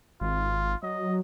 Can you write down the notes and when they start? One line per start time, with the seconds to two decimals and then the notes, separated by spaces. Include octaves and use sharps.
0.21 G#1 F4
0.83 F#3 D#5